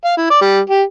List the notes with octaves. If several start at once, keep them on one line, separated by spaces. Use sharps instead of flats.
F5
E4
D5
G3
G4